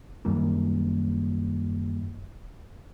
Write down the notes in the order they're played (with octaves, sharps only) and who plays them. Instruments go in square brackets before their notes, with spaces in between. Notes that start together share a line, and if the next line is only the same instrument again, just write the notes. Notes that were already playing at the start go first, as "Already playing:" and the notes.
[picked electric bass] F#2 D#3 G3 A#3